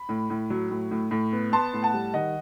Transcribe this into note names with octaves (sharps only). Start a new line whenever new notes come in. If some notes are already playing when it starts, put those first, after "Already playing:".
Already playing: B5
A2
A2
F#3
A2
A2
A2
B3
B3 A5 C6
A2
F#5 A5
G3
D#3 D#5 F#5